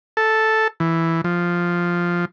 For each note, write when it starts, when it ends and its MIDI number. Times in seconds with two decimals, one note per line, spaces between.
0.17 0.68 69
0.80 1.21 52
1.24 2.25 53